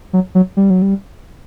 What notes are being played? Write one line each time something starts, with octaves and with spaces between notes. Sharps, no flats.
F#3
F#3
G3
F#3
G3